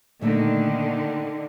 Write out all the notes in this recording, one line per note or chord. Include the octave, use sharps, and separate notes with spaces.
A#2 D3 D#3 A3 A#3